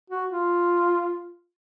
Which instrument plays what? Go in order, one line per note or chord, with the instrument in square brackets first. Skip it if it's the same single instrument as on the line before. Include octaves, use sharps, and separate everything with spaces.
[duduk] F#4
F4